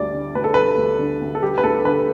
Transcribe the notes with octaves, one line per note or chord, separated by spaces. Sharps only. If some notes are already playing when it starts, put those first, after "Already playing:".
Already playing: D2 G3 D5
D3
D2 B4
A4
G3 B4
D2
D3
D2
A4
G3 G4
B4
D2 A4
D3 B4